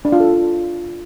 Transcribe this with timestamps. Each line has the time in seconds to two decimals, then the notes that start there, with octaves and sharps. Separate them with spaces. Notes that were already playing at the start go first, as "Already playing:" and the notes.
0.05 D4
0.12 F4
0.20 A4